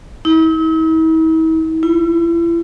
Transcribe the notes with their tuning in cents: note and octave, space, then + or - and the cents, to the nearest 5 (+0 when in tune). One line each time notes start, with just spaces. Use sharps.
E4 -45
E4 +35